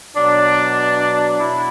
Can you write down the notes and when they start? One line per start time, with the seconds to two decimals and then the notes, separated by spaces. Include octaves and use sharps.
0.15 B2 F#3 D4
1.40 B2 E4